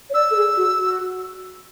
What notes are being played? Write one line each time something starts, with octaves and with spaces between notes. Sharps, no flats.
C#5
D5 E6
A4
G#4
F#4
F#4